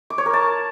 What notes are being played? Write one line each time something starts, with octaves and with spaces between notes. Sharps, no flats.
D6
C#5
A#4
A5